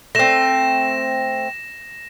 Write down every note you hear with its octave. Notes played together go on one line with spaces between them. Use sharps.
A3 C4 A#6 E7